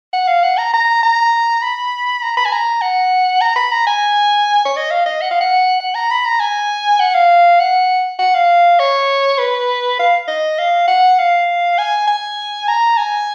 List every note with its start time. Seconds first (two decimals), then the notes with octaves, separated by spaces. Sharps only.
0.13 F#5
0.28 F5
0.43 F#5
0.58 A#5
0.73 A#5
1.03 A#5
1.62 B5
2.23 A#5
2.37 B5
2.45 G#5
2.52 A#5
2.82 F#5
3.41 A#5
3.56 B5
3.72 A#5
3.87 G#5
4.65 C#5
4.77 D#5
4.91 F5
5.06 D#5
5.21 F#5
5.31 F5
5.41 F#5
5.80 F#5
5.95 A#5
6.11 B5
6.25 A#5
6.40 G#5
7.00 F#5
7.14 F5
7.60 F#5
8.19 F#5
8.34 F5
8.80 C#5
9.39 B4
9.99 F5
10.28 D#5
10.59 F5
10.88 F#5
11.19 F5
11.78 G#5
12.08 G#5
12.68 A#5
12.97 G#5